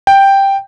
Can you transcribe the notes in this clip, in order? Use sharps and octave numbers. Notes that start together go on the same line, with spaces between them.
G5